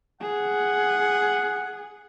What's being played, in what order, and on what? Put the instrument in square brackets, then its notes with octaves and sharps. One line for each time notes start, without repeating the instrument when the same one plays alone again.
[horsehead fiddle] G#4 [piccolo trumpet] F#5